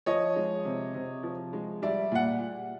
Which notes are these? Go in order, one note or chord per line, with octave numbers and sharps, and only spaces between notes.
F3 C#5 D#5
G#3
C3
C3
F3
G#3
G3 D5 E5
A#2 F#5